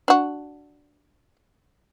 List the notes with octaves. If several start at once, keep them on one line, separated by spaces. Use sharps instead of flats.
D4 F#4